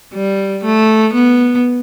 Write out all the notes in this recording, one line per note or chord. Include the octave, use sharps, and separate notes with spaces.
G3
A3
B3